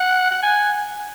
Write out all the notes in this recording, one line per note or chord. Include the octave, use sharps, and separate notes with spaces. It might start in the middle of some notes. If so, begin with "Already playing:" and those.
Already playing: F#5
F#5
G#5